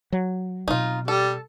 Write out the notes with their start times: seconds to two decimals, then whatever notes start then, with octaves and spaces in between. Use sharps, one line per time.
0.12 F#3
0.68 B2 C4 D#4 F4
1.08 G3 A4